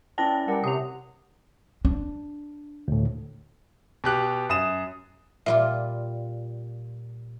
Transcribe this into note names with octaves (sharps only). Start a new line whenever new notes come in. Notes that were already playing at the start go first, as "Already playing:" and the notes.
C#4 E4 B4 D5 G5 A5 A#6
G3 A#4 F#5 G#5
C3 E4 C#5 A5 D#6 F7
D4
D2 A2
B2 G4 F#6
F#2 D#6 E7
A#2 G3 F4 E5